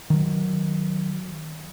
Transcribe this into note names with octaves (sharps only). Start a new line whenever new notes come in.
D#3 F#3